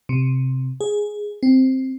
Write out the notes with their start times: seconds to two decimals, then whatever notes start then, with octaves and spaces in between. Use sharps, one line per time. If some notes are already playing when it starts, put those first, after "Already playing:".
0.09 C3
0.81 G#4
1.43 C4